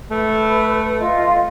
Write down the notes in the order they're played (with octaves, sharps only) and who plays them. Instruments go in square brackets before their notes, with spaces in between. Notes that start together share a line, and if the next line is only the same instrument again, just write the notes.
[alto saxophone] A3 [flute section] B4
[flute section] F4 D#5